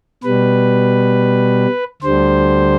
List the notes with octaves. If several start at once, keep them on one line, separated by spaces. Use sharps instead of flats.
B2 G3 B4
D2 D3 G3 C5